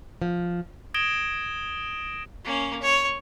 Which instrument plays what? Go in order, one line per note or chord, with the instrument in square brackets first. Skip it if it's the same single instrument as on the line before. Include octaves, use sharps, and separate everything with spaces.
[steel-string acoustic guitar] F3
[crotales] D#6 G#6 A#6 D7 E7 G7
[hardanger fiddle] A#3 C#4
C#5